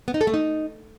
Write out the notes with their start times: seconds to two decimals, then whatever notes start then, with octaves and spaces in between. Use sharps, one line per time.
0.08 B3
0.14 D#4
0.21 A4
0.27 A3
0.34 D#4